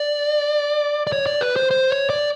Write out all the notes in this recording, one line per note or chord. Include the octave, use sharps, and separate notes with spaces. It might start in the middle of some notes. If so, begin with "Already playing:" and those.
Already playing: D5
D5
C#5
D5
B4
C5
C5
C#5
D5